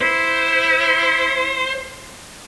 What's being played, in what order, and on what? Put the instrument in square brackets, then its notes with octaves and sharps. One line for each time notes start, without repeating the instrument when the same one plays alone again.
[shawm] E4 [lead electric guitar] C5